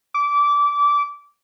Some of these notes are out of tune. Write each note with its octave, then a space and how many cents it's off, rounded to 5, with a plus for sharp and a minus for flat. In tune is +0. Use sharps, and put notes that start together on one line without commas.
D6 -20